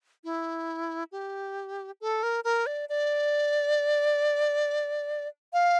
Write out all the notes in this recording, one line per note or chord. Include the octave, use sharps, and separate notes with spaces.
E4
G4
A4
A#4
A#4
D5
D5
F5